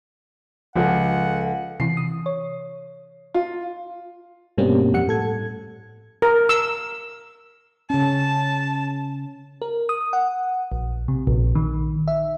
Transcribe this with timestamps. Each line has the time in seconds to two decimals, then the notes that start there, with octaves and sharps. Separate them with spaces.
0.76 C#2 F3 F4 A4 F#5
1.80 C3 E3 C7
1.97 D#6
2.26 C#5
3.34 F4
4.58 G2 B2 G3 A#3 C4 C#4
4.93 F2 G3 F#5 C#7
5.07 A2 A4 G#6
6.22 A#4
6.49 E6
7.90 C#3 C#4 A5
9.62 A#4
9.89 D#6
10.13 F#5
10.72 A#1
11.08 C3
11.27 A#1
11.55 D#3
12.08 E5